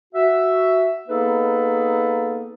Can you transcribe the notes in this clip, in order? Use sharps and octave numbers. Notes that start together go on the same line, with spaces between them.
F#4 E5
A#3 B3 D#4 G#4 A4 B4